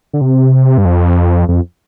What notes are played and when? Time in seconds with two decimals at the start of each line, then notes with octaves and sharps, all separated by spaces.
0.13 D3
0.21 C3
0.78 G2
0.85 F2
1.49 F2